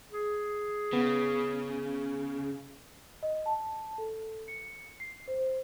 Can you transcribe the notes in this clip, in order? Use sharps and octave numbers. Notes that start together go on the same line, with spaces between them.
G#4
C#3 B3
D#5
A5
A4
C#7
C7
C5